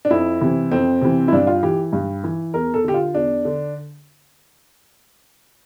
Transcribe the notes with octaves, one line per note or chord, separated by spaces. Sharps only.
D4
F2 E4
C3 E3
F2 C4
C3 E3
E4
G2 D4
F4
E3 G4
G2
E3
E2 A#4
A4
D3 G4
F4
E2 D4
D3